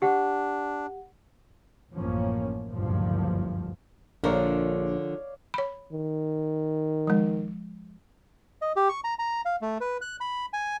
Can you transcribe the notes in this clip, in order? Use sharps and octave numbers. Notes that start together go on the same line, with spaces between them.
D4 G4 F#5
A1 F#2 F3 A#3 C#4
F#1 D2 G2 A#2 F3
A#1 D3 F3 A#4 C#5 D5 F5
C#5 B5
D#3
F3 G#3
D#5
G4
C#6
A#5
A#5
F5
A3
B4
F#6
B5
G#5